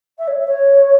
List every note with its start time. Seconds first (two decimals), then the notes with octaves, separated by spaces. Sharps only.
0.18 E5
0.27 C#5
0.38 E5
0.47 C#5